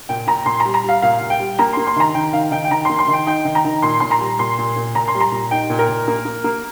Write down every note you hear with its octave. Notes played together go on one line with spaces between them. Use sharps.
A#2 G5
A#2 A#5
A#2 C6
G3 A#5
A#5
G3 F5
A#2 F5
A#2
G5
G3
A#3 A#5
A#3 C6
C6
D#3 A#5
D#3 G5
D#3 F5
D#3 G5
G5
D#3 A#5
A#3 C6
C6
D#3
G5
D#4 G5
D#3
A#5
D#3
A#2 C6
A#2 C6
A#5
G3
A#2 C6
A#2
A#2
A#2 A#5
C6
G3
A#5
A#2
D#4 G5
A#2
A#4
A#2
A#3
A#3
A#3